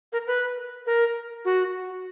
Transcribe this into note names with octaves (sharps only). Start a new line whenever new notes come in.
A#4
B4
A#4
F#4